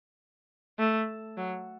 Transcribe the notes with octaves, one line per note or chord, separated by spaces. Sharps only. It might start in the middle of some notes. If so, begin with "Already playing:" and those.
A3
F#3